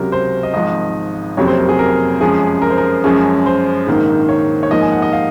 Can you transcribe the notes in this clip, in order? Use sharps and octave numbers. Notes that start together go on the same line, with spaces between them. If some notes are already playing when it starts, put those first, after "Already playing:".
Already playing: C#2 C3 F#3 A#4
C5
D#5
G#1 G#2 F3 D#5
F#1 F2 C3 F#3 C4 C#5
C5
A#4
G#4
A#4
F#2 F3 G#3 C#4 G#4
A#4
C5
A#4
F#2 F3 G#3 C#4
C5
A#1 G#2 D#3 A#3
C#5
C#5
G#2 F3 A#3 D#4 D#5
G#5
F#5
D#5
F5